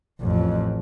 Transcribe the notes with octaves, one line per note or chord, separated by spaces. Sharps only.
A1 F2